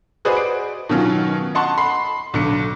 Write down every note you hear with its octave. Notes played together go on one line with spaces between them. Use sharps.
F#4 G#4 B4 C5 D5 D#5
D7
B2 D#3 F#3 C#4 F4
D#5 F#5 A5 C6 C#6
B5 C6 C7
B1 D3 C#7